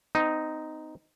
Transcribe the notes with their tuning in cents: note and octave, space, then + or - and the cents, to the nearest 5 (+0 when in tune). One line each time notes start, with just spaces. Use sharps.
C4 -35 D#4 +0